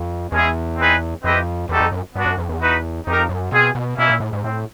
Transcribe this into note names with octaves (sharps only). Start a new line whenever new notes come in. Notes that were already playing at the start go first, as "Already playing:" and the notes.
Already playing: F2
E2 G#3 C#4 E4 G#4
C4 D#4 G#4 B4
F2 C4 E4 G4 B4 D#5
E2 G3 C4 D#4 F#4 A4
F2
F#2
G2 B3 D4 F#4
F#2
F2
E2
D#4 F#4 B4
F2 D#4 G4 A#4
F#2
B2 C4 F4 G#4
B2
B2 A#3 C#4 E4
A#2
A2
G#2
A2 C4